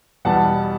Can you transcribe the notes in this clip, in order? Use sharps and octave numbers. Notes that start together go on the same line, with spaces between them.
E2 B2 G3 F#5 A5